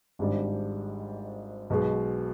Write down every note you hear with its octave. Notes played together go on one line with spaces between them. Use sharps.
G#1 G#2 G3 D4
B1 B2 G#3